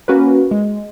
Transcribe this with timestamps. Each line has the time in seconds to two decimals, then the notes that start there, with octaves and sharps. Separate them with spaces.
0.08 A#3 C#4 F#4 A#4 B4
0.51 G#3